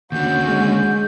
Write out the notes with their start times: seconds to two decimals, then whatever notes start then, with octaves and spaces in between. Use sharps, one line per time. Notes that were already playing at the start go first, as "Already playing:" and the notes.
0.12 D#2 D3 C#4 F#4 G6
0.47 G#3